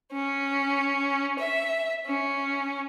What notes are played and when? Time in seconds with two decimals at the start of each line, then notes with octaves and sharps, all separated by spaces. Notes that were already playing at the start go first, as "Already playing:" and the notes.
0.13 C#4
1.38 E5
2.06 C#4